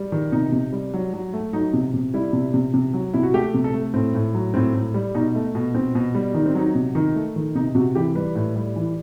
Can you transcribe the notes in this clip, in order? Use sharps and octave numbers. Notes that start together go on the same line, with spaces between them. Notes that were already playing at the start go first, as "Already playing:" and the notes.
Already playing: G3
D#3
C3 D#4
C3
G3
F#3
F#3
A3
F#3 D#4
C3
C3
G3 E4
C3
C3
C3
F#3
C3 E4
F#4
A3 G4
C3
A4
A3
A2 C4
A2
F#3
A2 C4
A2
G3
B2 D#4
A3
B2
B2 C4
B2
G3
D#3 D#4
C4
F#3 D#4
C3
D#3 D#4
A3
D#3
C3 D#4
C3 F#4
E3 G4
G3 B4
A2
G3
E3